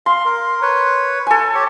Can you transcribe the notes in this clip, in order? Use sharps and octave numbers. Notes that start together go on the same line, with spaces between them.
F5 C6
A#4
B4 C#5
A4 G#5
G4 C#5